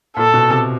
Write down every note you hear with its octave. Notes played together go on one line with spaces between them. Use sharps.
A#2 A4
B2
C3